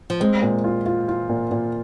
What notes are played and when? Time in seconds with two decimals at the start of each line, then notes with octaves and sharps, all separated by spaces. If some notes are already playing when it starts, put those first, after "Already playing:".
0.10 F3
0.20 G#3 C4
0.42 A#2
0.64 F4
0.86 F4
1.08 F4
1.29 A#2
1.51 A#2